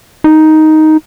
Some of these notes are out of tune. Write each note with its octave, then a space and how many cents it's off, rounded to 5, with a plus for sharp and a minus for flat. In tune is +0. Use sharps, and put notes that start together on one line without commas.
D#4 +5